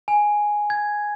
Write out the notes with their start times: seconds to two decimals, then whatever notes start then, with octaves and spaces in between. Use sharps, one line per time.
0.08 G#5
0.70 G#6